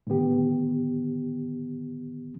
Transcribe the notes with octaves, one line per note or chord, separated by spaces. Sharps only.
A2 D3 D#3 B3 G4